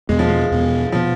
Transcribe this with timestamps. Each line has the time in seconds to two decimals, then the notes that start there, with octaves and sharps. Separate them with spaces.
0.09 E2 B2 G#3 B3
0.19 F3
0.28 G#3
0.51 E2 B2 B3
0.92 B2 F3 B3